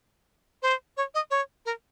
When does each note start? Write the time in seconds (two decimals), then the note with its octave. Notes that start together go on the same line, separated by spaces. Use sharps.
0.62 C5
0.97 C#5
1.14 D#5
1.31 C#5
1.66 A#4